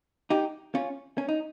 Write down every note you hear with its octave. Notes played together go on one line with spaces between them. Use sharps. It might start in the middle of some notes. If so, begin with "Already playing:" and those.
D#4 G4
C#4 F4
C#4
D#4